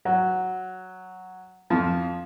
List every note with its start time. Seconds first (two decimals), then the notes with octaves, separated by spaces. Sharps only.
0.05 F#3
1.70 F2 F3